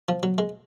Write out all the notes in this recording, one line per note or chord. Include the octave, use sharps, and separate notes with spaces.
F3
F#3
G#3